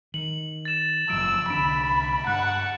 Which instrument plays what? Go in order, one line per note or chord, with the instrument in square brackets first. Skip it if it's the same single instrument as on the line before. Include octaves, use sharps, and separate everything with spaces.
[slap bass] D#3 [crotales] F#7
[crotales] A6 E7
[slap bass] F#1 C2 F3 [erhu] E6 [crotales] D7
[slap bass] C2 D3 D4 [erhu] B5 [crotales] D7 E7
[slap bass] G2 [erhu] F#5 [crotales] F#6